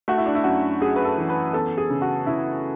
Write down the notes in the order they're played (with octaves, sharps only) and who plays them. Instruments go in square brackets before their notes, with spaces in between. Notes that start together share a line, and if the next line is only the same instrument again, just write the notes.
[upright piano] A3 F#4
E4
D4
E4
F#2 F#4
F#2 G#4
B4
A4
E3
B4
B3 A4
G#4
C#3
F#4
C#3 E4